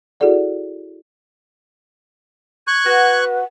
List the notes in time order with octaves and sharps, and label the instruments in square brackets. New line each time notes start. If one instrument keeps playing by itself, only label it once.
[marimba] E4 F#4 G#4 A4 D5 F#5
[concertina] C#6 F#6 [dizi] G#6
[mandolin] F#4 [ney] B4